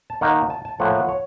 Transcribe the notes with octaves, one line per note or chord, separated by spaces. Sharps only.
A5
D#3 A#3 D#4 F#5
A5
A5
A2 F3 A#3 F#5
F#5
C#5